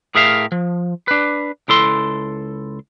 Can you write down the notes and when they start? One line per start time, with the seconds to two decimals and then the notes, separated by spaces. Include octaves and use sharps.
0.15 A2 G#4 A#4 E5 F5
0.52 F3
1.08 D4 B4
1.68 C#2 E4 A4 C6